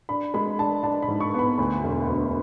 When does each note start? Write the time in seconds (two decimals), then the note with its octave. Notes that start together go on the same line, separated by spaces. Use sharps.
0.09 D4 B5
0.34 G#3 B5
0.59 D4 A5
0.83 D4 A5
1.02 B5
1.08 G#2
1.21 C#6
1.34 B3
1.39 B5
1.58 D2 B5
1.84 E1
2.09 D2